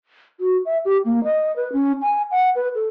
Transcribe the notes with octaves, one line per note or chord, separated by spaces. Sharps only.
F#4
E5
G4
A#3
D#5
B4
C#4
G#5
F#5
B4
A4